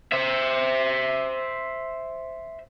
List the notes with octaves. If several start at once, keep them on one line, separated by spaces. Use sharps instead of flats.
C5 E5